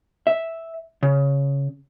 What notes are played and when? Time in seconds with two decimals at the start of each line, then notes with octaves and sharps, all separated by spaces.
0.27 E5
1.03 C#3